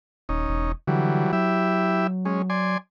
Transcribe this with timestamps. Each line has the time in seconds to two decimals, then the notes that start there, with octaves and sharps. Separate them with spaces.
0.29 D#1 C#4 D#4
0.49 E1
0.87 D3 E3 F#3 G3
1.33 F#3 E4 G4 E5
2.25 G#3 C#4
2.50 D5 G#5 C6